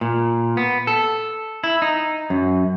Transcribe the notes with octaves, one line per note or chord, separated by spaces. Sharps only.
A#2
B3
A4
E4
D#4
F#2